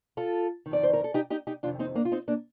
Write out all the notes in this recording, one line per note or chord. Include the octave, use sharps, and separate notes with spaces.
F4 A4
D#3
F2 D5
C5
A#4
A4
D#4 G4
D#4 G4
D#4 G4
F2 C3 D#3 D4 F4
C4 D#4
A#3 D4
F4
C4 D#4
A#3 D4